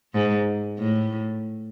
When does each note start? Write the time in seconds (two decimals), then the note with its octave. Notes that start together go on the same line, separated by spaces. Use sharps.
0.14 G#2
0.79 A2